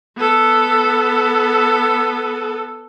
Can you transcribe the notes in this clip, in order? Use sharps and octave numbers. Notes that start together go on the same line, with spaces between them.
B3 A4